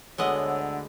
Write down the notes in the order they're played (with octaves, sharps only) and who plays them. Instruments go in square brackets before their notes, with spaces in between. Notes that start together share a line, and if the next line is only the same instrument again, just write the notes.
[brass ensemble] D2 D3 [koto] G#3 B3 D#5 [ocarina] C#5 [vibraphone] F#5 E6